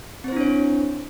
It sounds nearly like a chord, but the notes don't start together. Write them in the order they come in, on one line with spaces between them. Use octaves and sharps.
C4 C5 E4 D4 C#5